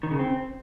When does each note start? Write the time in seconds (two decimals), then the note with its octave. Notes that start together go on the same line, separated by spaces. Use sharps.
0.03 D#3
0.11 C#3
0.19 C4